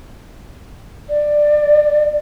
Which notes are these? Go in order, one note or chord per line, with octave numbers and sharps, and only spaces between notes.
D5